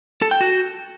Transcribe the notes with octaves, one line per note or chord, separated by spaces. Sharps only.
A4
G5
F#4